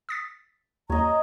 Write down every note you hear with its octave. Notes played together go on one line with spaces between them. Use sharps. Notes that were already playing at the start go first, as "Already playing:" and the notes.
D#6 A6 B6
D#2 C#5 D#5 A#5